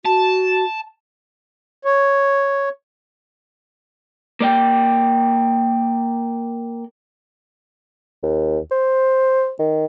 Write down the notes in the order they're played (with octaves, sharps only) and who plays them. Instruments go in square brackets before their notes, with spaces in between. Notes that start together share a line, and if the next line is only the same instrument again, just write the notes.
[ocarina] F#4 [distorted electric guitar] A5
[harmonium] C#5
[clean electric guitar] A#3 D5 G5
[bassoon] D#2
C5
D#3